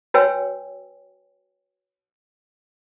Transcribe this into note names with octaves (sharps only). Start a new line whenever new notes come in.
F#4 B4 C#5 G5 G#5 E6